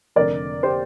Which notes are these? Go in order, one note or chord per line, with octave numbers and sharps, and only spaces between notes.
F1 F2 D3 A#4 D5
G4 C5